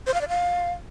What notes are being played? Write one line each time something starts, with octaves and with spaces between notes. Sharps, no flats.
C5
F5
D5
F5